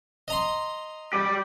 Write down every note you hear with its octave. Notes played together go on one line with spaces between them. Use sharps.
D#5 A#5 C6
G4 D5